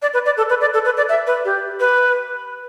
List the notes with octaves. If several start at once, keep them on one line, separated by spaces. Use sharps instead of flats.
D5
B4
D5
A4
B4
D5
A4
B4
D5
E5
B4
G4
B4